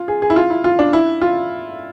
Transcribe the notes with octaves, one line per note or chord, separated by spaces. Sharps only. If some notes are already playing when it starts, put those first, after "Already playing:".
Already playing: F4
G#4
G#4
E4
F4
E4
F4
D4
E4
F4